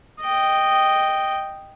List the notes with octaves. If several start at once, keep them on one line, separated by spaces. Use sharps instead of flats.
D#5 G5